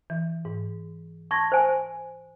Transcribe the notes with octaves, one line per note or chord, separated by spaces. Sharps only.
E3
G#2
A5 C6 C#6 G#6 A#6
C5 G#5